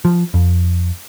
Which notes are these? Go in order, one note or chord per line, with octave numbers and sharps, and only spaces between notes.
F3
F2